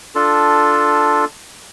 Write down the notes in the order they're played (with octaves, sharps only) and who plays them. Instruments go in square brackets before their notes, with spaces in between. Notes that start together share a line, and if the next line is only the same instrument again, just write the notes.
[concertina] D4 F4 A4